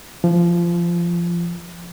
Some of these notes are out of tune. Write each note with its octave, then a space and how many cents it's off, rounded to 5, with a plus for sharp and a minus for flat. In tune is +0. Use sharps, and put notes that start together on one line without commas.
F3 -20